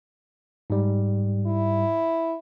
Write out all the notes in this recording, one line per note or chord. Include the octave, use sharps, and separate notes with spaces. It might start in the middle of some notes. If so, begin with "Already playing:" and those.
G#2 G3
E4